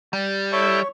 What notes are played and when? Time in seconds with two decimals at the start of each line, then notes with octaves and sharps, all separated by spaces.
0.13 G3
0.52 E4 A4 C#5 G5